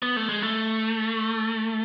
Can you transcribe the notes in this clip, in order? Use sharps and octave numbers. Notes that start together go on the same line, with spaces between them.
B3
A3
G#3
A3